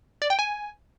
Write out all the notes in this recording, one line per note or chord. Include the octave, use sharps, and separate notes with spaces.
D5
G5
G#5